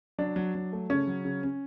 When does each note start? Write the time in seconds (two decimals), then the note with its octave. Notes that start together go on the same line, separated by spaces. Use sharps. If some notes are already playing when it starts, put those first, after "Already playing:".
0.18 F#3 D4
0.36 F#3
0.55 F#3
0.73 A3
0.90 C#3 C#4
1.07 F#3
1.25 C#3
1.43 C#4